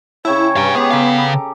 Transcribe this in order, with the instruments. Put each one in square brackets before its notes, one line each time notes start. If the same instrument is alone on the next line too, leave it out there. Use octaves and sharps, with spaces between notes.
[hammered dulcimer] C#3 G5 A5 [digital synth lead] E4 [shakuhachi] C#5
[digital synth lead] G2 [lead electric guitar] F5 G#5 [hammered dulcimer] A#5
[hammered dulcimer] G#3 G4 [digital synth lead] B3 [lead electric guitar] G#4
[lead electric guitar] C#3 F5 [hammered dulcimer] G4 A4 A#5